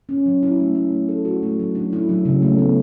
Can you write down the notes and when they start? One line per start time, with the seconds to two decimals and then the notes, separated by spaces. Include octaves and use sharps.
0.09 C#4
0.26 F#3
0.43 E4
0.59 A3
0.75 E4
0.92 A3
1.09 A4
1.25 F#4
1.43 A3
1.59 F#3
1.75 D4
1.93 E4
2.09 F#3
2.25 C#3
2.42 A3
2.58 B3